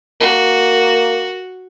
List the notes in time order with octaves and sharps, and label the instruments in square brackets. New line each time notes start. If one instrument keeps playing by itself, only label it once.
[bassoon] A#3 [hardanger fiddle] F#4